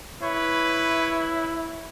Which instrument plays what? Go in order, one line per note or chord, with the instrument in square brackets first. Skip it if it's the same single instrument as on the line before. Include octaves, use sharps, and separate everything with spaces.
[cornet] E4 [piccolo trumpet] B4 [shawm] C#5